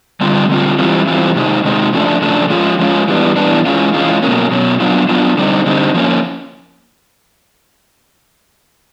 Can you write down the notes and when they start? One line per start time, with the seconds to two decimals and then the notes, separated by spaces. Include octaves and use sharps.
0.21 D3 G3 C4 F4
0.49 D3 G3 C4 F4
0.79 E3 G3 C4 F4
1.07 E3 G3 C4 F4
1.36 C3 D#3 G#3 C4 D#4
1.64 C3 D#3 G#3 C4 D#4
1.93 C#3 F3 A3 D4
2.22 C#3 F3 A3 D4
2.50 F3 G#3 C#4 F4
2.79 F3 G#3 C#4 F4
3.08 E3 G3 B3 D4
3.36 E3 G3 B3 D4
3.66 E3 G#3 C#4 F4
3.94 E3 G#3 C#4 F4
4.23 B2 F#3 A#3 C#4
4.51 B2 F#3 A#3 C#4
4.80 F#3 B3 D4 F4
5.09 F#3 B3 D4 F4
5.37 D3 G3 C4 D#4
5.66 D3 G3 C4 D#4
5.94 F3 A#3 C#4